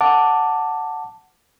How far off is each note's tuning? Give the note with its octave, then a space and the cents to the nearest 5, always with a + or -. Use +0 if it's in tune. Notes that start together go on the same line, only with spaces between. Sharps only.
F#5 -5 A5 +10 D6 +0